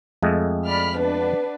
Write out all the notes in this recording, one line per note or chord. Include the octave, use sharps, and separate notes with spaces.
F2 G#3 A3
D5 B5 F6
B3 D4 B4